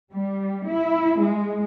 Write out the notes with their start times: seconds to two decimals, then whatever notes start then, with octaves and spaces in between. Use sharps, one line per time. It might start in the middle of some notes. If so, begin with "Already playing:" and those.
0.13 G3
0.68 E4
1.20 G#3